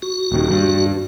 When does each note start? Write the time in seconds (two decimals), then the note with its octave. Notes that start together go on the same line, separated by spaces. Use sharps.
0.02 F#4
0.32 D#1 D#3
0.51 G2